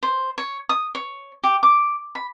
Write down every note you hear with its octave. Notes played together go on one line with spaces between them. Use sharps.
C5
C#5
D#6
C#5
G4
D6
B5